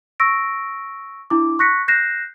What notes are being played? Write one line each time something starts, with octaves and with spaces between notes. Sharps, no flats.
C#6 E6 A#6 D7
D4 E4 D6
C#6 F#6 A#6 B6 C#7
F#6 G6 A#6 C7 E7